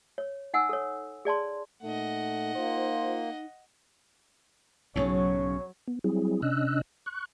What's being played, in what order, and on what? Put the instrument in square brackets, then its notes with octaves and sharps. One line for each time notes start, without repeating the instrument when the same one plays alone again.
[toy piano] C#5
D#4 F#5 G#5 E6
A4 C#5
G#4 D5 A5 C6
[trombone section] A#2 A3 [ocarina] D#4 [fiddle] D#5 F#5
[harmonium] A#3 [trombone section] F4 C5
[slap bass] B1 G#2 [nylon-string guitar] C#3 C#4 A4 [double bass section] F#3 [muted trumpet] C#5
[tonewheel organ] B3
F#3 G3 C4 E4 G#4
C3 C#4 D4 D#5 E6 F#6
C#6 F#6